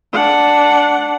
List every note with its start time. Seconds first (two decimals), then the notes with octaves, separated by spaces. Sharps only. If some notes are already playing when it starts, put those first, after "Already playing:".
0.13 D4 F#5